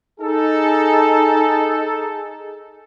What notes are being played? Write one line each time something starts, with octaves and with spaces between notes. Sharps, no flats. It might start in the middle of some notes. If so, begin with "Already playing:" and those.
D#4 G#4 A4